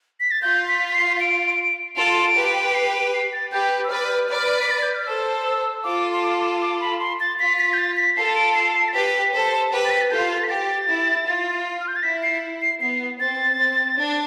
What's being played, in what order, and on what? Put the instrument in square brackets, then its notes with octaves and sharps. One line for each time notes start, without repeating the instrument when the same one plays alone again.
[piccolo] B6
A6
[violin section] F4 [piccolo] G6
[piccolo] B6
B6
C7
D7
[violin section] F4 A4 [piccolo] D7
[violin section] G4 B4
[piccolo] D7
C7
D7
C7
A6
[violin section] G4 B4 [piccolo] G6
[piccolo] E6
[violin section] B4 D5 [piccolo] F6
[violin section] B4 D5
[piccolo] B6
A6
G6
F6
[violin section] A4 C5 [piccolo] E6
[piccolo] E6
[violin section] F4 A4 [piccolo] D6
[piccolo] C6
D6
D6
B5
C6
A6
[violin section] F4 [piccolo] B6
[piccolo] B6
G6
A6
B6
[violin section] F4 A4 [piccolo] C7
[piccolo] D7
C7
C7
A6
[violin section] G4 B4 [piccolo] B6
[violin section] A4 C5
G4 B4
[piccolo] A6
B6
A6
[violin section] F4 A4 [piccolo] G6
[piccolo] A6
B6
[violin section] G4 [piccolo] A6
[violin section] E4
F4
[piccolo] F6
G6
A6
[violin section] E4 [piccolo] B6
[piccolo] C7
C7
[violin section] B3 [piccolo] C7
[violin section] C4 [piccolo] A6
[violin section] C4
D4